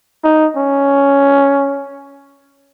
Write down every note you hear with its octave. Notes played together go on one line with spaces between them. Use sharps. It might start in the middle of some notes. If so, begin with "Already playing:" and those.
D#4
C#4